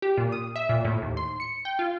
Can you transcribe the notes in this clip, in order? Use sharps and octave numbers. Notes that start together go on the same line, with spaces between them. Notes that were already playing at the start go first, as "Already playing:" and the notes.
G4
A#2
D#6
E5
A#2
A2
D#2
C6
C#7
G5
F4